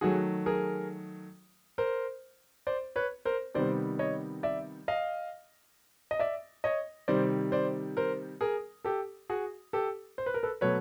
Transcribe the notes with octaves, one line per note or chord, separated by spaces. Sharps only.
D#3 F#3 A3 F#4 G#4
G#4 A#4
A#4 C5
C5 D5
B4 C#5
A#4 C5
C3 D#3 G3 B3 C5 D5
C#5 D#5
D5 E5
D#5 F5
D#5
D5 E5
C#5 D#5
C3 D#3 G3 C5 D5
C5 D5
A#4 C5
G#4 A#4
G4 A4
F#4 G#4
G4 A4
C5
B4
A#4
A4 B4
B2 F#3 A3 B4 C#5